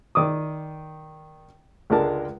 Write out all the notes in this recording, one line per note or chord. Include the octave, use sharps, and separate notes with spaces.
D#3 D5 D6 D#6
C#2 D3 G#3 D4 A#4 A5